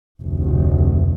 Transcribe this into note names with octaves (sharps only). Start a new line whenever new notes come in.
F1 D2